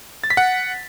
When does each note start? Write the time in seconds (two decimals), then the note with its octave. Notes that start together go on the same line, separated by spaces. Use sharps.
0.24 A6
0.30 B6
0.37 F#5